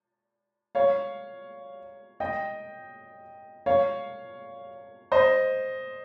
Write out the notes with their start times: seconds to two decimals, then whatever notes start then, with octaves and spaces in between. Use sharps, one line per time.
0.75 C#5 F5
2.20 D#5 G5
3.66 C#5 F5
5.12 C5 D#5